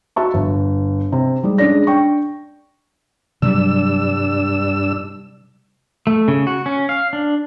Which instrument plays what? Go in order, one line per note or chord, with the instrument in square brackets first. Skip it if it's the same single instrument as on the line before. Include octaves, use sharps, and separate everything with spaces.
[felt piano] F#4 E5 A5 C#6
G1
C3
G3 G#3
G#3 C#4 D4 D5 A#6
D4 G5 C#6
[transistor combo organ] G2 D4 E6 [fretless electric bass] C3 F#3 G3
[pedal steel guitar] A3
C#3
F#4
C#4
F5
D4